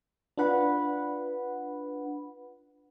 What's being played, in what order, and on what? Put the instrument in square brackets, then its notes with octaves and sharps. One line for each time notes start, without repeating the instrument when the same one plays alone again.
[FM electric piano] D4 F4 B4 F#5 B5